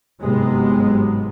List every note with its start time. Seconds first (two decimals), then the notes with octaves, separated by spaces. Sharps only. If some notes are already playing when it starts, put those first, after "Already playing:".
0.21 G1 G#2 C3 F#3 G#3 B3